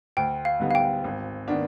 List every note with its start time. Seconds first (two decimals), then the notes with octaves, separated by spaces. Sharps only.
0.17 D2 G5
0.45 F5
0.60 D3 G3 B3 D#4
0.71 F5
0.75 G5
1.04 G#1
1.48 D#3 B3 D4